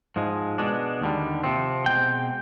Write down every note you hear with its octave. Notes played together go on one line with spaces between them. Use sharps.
G#2 F3 G#3
B2 G#3 D4
D#2 D3 G3
C3 F3 C4
B2 G#3 C4 G5